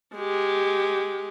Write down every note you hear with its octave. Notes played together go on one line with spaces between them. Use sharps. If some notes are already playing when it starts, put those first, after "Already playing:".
G#3 G4